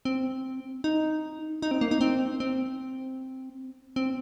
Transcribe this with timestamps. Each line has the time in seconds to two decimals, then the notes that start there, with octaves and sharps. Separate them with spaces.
0.05 C4
0.84 D#4
1.62 D#4
1.71 C4
1.81 A#3
1.91 D#4
2.01 C4
2.40 C4
3.96 C4